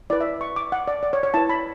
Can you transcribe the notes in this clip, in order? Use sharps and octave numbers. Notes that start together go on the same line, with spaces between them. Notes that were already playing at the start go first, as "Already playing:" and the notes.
E4 B4 D5
E5
C#6
D6
F#5
D5
D5
C#5
C#5
E4 B4 A5
B5